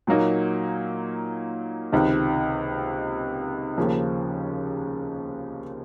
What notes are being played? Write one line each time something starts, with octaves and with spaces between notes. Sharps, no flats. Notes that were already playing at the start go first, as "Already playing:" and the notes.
A#2 F#3 A#3 D#4
C#2 C3 D#3
D#2 C#3 F3 A#3